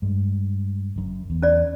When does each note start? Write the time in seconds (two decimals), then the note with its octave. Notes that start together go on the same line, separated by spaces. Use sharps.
0.02 G2 G#3
0.96 F#1 F#2
1.30 E2
1.42 C#4 D5